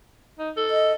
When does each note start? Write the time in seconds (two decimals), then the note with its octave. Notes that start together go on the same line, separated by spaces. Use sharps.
0.39 D#4
0.57 A4
0.71 D#5